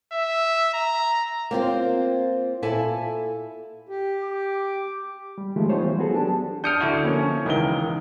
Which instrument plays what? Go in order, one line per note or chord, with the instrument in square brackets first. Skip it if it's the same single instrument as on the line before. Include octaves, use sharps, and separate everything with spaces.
[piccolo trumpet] E5
A#5
[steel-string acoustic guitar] A#3 C4 F4 C5
A#2 E4 A4 E5 G#5 A5
[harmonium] G4
[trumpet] D6
[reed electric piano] G3
D#3 F3 G#3 A3 G4
G3 B3 D#4 F4 C5 C#5
E3
F#3 B3 F#4 G#4 A4
D4 G4 A5
[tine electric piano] D4 D#6 F6 [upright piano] G6 C#7 D7
[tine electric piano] D3 E4 F#4 [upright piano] G#6
[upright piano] F3 A#3 C#4
[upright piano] C#2 A#4 G7 [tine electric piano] D#3 E3